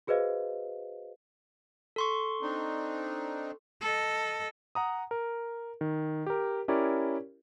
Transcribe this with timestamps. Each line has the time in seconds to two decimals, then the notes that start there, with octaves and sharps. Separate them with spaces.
0.07 F#4 G#4 B4 C5 D#5 F5
1.96 A4 C6 C#6
2.42 C4 D4 D#4
3.81 A4 D#5
4.75 F#5 A#5 D#6
5.11 A#4
5.81 D#3
6.26 G4 A#4
6.68 C#4 E4 G4 A#4 C#5 D5